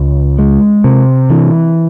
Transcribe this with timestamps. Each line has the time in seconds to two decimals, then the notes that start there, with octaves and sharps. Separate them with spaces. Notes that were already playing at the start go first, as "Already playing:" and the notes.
Already playing: C#2
0.38 G#3
0.84 C3
1.30 E3